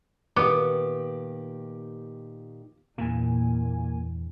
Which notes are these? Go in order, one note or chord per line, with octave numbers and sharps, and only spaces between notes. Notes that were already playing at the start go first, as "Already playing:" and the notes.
A#2 D#3 B3 G4 D6
E2 G2 A#2 E3 A#3 G#5